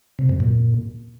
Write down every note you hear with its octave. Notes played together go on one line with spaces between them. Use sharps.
C3
F#2
A#2